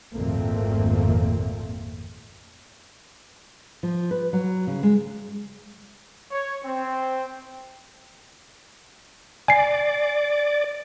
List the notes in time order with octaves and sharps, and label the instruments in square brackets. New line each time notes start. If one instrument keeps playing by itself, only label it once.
[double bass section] G#1 F2 A#2 A3 A#3 C4
[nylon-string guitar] F3
B4
F#3
C#3
G#3
[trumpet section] C#5
C4
[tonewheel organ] D5 [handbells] G#5 C7